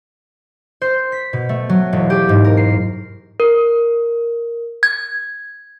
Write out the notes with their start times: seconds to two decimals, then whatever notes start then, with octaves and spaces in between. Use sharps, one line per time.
0.82 C5
1.12 B6
1.33 B2
1.49 A3
1.69 F#3
1.93 E1
2.10 G4
2.29 G#2
2.44 A#4
2.57 C7
3.40 A#4
4.83 G#6